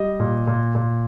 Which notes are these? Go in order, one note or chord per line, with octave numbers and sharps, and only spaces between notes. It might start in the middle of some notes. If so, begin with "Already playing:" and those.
Already playing: G3 D#5
A#2
A#2
A#2